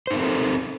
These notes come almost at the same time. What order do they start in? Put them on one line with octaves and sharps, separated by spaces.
C5 D#4 A#4 C4 A4